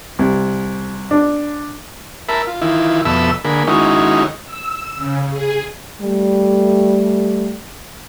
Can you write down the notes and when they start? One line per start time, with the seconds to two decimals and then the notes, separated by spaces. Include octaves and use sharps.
0.19 C2
1.11 D4
2.29 A#4 E5 A5 B5
2.47 F4
2.61 D#3 E3 E4 F4
3.05 F2 B2 A4 E5 B5 E6
3.45 D3 A#3 G#4 B5
3.67 D#3 G#3 C#4 D#4 E4 F#4
4.46 E6
4.96 C#3
5.30 G#4
5.99 G3 A3